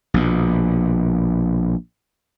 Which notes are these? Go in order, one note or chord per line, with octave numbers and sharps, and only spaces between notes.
A#1 B2